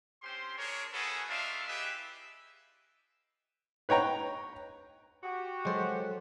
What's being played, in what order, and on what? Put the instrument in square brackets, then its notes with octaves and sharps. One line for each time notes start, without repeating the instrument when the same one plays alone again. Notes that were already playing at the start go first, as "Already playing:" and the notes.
[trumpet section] C4 C#4 G4 C5 C6
D4 G#4 A#4 C#5
A#3 C#4 F#4 G#4 A4 B4
A3 D4 D#4 F4 E5 F5
E4 G4 G#4 B4 D#5 E5
[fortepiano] B4 C#5 G5 A#5
[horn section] F#4 G4
[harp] F#3 A4 [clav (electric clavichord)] G#3 C5